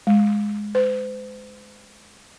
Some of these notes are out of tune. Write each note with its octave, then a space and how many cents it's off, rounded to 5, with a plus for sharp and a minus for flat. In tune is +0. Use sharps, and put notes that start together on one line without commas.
G#3 +0
C5 -45